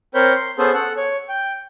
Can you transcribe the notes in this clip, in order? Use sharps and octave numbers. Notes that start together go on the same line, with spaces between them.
C4 A#4 C5 C#5 B5 G6
C6
B3 C#4 G#4 A4 C5
A4 F#5
C#5
G5